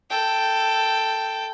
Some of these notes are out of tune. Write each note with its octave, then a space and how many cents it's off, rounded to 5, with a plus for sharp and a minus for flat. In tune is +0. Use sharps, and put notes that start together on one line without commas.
A4 +5 G5 +0